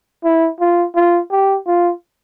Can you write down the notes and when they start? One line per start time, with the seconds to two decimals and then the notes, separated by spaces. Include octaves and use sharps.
0.24 E4
0.60 F4
0.95 F4
1.32 G4
1.67 F4